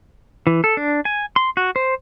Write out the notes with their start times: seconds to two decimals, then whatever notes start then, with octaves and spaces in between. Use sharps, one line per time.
0.47 E3
0.64 A4
0.77 D4
1.05 G#5
1.36 C6
1.57 F#4
1.76 C5